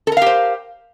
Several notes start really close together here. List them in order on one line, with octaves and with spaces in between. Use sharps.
A4 A#4 F5 G4 C5